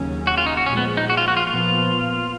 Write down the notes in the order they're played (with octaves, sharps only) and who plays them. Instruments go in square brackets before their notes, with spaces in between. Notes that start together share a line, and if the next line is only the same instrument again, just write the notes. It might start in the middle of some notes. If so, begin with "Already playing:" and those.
Already playing: [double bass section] D#2 C#3 F#3 C#4
[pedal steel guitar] F#4
F4
D#4
F#4
[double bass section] A#2 F3 G#3 [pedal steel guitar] C#4
[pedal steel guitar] B3
D#4
F#4
F4
F#4
F4
[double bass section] A#2 F3 B3 [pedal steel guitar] F4